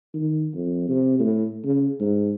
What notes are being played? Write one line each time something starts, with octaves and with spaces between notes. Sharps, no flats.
D#3
F2
C3
A2
C#3
G#2